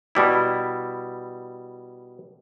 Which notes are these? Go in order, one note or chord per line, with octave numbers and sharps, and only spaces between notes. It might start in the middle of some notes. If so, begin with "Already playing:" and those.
B2 G3 E4